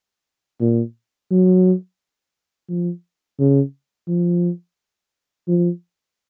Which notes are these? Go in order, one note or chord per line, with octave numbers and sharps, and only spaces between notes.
A#2
F#3
F3
C#3
F3
F3